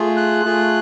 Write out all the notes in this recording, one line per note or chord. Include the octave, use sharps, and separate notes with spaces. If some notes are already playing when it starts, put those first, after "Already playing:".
Already playing: A3 F4 G#4
F#6
A3 F4 G#4